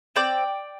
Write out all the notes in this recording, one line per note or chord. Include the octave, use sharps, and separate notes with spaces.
C4 D5 G5